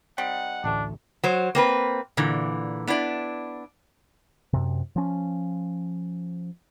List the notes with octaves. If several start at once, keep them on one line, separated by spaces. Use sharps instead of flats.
G3 C4 D#4 F#5
A1 D2 A3 D4
F#3 C5
A#3 C4 B4
A#2 D3 E3
B3 D4 E4 D5
F#2 C3
F3 C#4